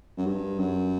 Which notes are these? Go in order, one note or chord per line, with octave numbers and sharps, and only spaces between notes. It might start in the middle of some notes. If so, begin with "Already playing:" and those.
F#2
G2
F#2